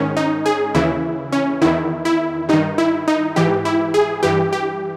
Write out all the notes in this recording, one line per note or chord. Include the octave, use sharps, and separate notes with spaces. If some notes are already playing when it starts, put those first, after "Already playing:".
Already playing: G#2 D#3 C#4
D#4
G#4
D#2 C#3 E3 E4
C#4
E2 D#3 E4
E4
G2 D#3 D#4
E4
D#4
G#2 E3 G4
E4
G#4
G2 E3 G4
G4